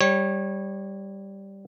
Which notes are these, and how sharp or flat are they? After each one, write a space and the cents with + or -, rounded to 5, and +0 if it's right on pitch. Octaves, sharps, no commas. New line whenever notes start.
G3 +0 C#5 -20